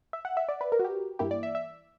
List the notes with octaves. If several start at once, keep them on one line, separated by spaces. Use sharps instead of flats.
E5
F#5
E5
D5
B4
A#4
F#4
G4
G2 E3 A#3 E4 G4
D5
E5
E5